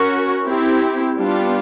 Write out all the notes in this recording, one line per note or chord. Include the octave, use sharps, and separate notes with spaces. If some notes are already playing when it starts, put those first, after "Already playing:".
Already playing: C#4 F#4 A#4
C4 E4 G4
G3 B3 D4 F4